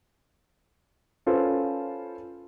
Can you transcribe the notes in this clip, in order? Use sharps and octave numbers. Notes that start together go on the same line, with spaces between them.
C#4 F4 A4 B4 C5